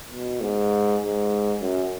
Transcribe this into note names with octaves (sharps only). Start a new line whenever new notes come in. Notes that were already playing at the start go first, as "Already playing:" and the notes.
B2
G#2
G#2
F#2